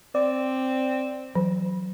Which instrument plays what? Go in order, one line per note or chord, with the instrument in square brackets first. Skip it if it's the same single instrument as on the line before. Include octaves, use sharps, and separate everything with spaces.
[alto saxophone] C4 [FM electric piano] D5
[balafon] E3 [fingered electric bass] F#3